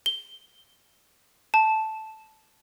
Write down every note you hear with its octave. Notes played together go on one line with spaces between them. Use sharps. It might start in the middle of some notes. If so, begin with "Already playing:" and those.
G7
A5